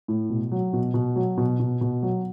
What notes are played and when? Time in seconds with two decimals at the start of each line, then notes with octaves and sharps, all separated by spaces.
0.08 A2
0.30 B2
0.52 F#3
0.73 B2
0.94 B2
1.16 F#3
1.37 B2
1.60 B2
1.81 B2
2.03 F#3